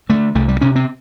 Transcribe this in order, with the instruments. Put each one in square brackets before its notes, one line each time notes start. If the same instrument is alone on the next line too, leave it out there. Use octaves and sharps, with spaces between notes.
[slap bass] D3 A3
C2 A3
G3
C3 C#4
C4